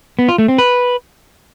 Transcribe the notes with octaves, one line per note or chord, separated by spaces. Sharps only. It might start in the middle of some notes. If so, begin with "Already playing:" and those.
B3
F4
A3
C4
B4